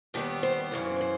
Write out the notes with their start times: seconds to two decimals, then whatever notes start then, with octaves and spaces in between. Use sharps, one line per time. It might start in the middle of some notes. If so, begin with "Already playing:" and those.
0.14 D#2 D#3 G3 B3 G4
0.43 C5
0.72 F#2 C#3 E3
1.01 C5